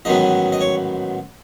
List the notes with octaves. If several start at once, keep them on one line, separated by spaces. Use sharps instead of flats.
A1 G#2 D#3 F#3 B3 D#5
D#5
C#5